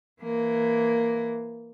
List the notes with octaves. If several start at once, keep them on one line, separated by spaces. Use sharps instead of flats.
E3 A#3